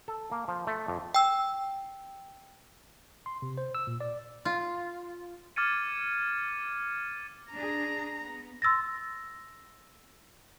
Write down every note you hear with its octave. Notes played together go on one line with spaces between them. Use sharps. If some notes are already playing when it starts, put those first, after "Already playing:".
A4
A#3
F3
A3
F2
G5 E6
C6
C3
C5
E6
A#2
D5
F4
D6 F6 G#6 A6 C#7 D#7
D4 G#4 A#5
B3
C6 E6 A6 A#6